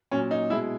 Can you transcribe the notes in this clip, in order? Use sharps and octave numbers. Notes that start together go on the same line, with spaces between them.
A#2 F#3 C#4
D#4
B2 G#3 E4